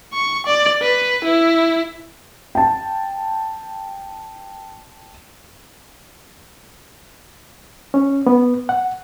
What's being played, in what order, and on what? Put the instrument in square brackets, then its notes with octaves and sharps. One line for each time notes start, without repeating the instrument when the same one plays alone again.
[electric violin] C#6
D5
B4
E4
[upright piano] G5 A5
[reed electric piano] C#4
B3
F#5